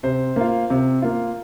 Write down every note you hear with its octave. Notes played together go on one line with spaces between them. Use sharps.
C3 C5
A#3 F4
C3
A#3 F4